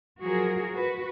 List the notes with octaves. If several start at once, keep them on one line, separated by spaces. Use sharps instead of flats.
F3 F#3 F#4 G#4 A#4
F#4 B4